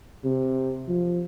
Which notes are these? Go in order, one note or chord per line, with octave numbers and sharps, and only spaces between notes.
C3
F3